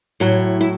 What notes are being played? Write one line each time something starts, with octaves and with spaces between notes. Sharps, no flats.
A2 F#3 E4
E4